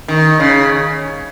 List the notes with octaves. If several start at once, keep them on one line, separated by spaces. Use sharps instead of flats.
D#3
C#3